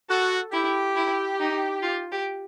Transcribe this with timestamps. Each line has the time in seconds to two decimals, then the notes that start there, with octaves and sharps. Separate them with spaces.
0.09 F#4 A4
0.53 E4 G4
0.95 E4
1.40 D#4
1.83 F4
2.12 G4